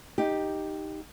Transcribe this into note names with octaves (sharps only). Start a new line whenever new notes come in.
D#4 G4